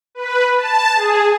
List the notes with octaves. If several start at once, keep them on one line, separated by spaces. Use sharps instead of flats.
B4
A5
G#4